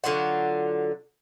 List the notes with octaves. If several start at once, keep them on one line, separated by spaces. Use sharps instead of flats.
D3 F#3 F4 F#5